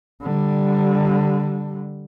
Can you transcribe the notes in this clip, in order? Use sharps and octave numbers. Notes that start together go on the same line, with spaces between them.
D3 G3